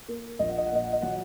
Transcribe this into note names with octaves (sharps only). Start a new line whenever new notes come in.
A#3
A#1 D#5
F#5
D#5
F#5
A#2 D#5
F#5
D#5
F#3 F#5